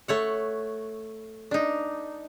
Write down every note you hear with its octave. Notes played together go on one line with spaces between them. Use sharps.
A3 C#5 F#5
D4 D#4